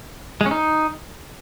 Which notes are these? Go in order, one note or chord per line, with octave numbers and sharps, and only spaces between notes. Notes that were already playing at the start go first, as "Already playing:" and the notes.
G#3
C#4
D#4